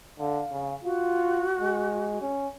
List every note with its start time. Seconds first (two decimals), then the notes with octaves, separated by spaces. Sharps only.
0.19 D3 F5
0.51 C#3
0.84 F4 F#4
1.61 G#3
2.22 C#4